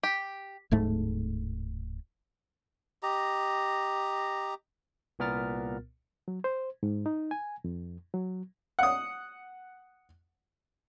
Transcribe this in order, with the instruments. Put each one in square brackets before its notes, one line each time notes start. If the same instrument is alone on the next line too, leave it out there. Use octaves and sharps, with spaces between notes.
[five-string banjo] G4
[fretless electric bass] D1 G#2 A3
[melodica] G4 D#5 A#5
[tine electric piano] C2 A#2 B3 A#4 F6 A6
[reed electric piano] F#3
C5
G#2
D#4
G#5
F2
F#3
[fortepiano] F#5 D#6